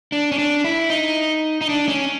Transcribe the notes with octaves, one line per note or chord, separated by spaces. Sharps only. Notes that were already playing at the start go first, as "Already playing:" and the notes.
D4
C#4
D4
E4
D#4
D#4
D4
C#4